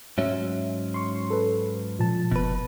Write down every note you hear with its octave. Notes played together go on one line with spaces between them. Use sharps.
G#2 F#3 C#4 E5
C6 C#6
A4 B4
A#2 F3 A5
F#1 B2 B4